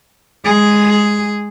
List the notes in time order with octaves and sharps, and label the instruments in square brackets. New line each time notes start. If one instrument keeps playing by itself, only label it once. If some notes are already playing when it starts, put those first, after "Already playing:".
[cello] G#3 G#4